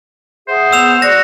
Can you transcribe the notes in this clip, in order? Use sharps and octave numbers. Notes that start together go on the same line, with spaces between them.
G#4 C5 E5 F#5
B3 E6 E7 F7
F#4 D5 A#6